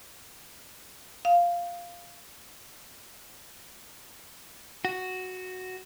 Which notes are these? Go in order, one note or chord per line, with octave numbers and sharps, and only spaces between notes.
F5
F#4